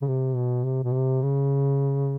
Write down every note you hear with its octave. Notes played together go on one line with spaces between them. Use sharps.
C#3
C3
B2
C3
B2
C3
C#3